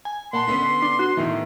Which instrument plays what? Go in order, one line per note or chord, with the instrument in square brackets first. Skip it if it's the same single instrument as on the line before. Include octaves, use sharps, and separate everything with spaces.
[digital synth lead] G#5
[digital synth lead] A#2 [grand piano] F#5 A5 B5 [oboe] C6
[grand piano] D3 B3 C#4 [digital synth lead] B6
[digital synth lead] D4
F#4
[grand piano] A2 D#3 B3 [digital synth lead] E3